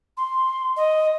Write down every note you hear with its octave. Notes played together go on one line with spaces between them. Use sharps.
C6
D#5